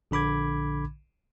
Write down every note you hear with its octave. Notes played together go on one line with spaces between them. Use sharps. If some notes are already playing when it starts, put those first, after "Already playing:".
A#1 D3 B5 D6 G#6